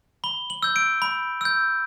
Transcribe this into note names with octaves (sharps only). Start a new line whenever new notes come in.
B5 G7
F#7
E6 G6
D7
B5
E6 G6